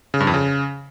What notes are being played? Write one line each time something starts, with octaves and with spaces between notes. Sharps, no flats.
C#3
G2
F2
C#3